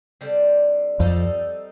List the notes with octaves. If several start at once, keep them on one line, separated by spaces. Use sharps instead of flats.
D3 G3 C4
F2 G3 C4 D#4 A4